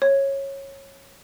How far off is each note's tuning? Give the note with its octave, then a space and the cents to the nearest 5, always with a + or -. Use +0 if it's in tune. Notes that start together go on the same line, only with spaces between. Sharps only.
C#5 -15